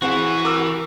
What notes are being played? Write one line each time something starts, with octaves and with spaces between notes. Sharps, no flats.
E3 C4 F#4 G#4 F#5
A#4 D6 E6